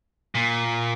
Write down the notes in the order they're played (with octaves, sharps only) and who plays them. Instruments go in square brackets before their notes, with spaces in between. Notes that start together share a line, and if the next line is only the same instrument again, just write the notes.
[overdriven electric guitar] A#2